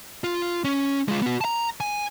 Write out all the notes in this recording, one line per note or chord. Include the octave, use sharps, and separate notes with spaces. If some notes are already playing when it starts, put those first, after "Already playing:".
F4
C#4
G#3 F4
B3 F#4
A5 A#5
G#5